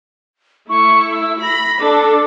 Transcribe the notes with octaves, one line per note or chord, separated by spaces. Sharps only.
A3 E4 C#6
E6
B5 A#6
D4 A4 D6